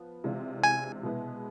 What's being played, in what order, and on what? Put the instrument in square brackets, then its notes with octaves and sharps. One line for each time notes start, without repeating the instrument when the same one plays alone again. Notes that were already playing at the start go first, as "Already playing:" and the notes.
Already playing: [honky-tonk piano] F3 B3
C3 E3 G#3 D4 F4
[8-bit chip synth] G#5
[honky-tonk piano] B2 G#3 B3 E4